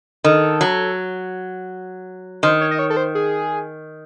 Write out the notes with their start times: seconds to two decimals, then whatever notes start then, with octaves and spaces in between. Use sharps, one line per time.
0.24 D#3 A4
0.61 F#3
2.43 D#3 C5
2.61 C#5
2.71 D#5
2.79 C#5
2.90 A4
2.97 C5
3.15 G#4